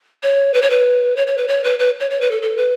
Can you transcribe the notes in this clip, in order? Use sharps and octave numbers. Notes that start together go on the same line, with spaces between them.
C#5
B4
C#5
B4
C#5
C#5
B4
C#5
B4
B4
C#5
C#5
B4
A4
A4
B4